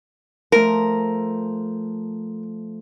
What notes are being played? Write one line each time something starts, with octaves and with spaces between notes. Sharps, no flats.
F3 A3 A#4